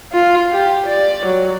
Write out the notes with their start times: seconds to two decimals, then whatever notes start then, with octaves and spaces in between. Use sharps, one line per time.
0.13 F4
0.52 G4
0.87 D5
1.26 F#3